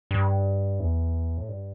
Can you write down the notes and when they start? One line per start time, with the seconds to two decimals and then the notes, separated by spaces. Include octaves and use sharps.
0.11 G2
0.80 E2
1.38 A2
1.49 G2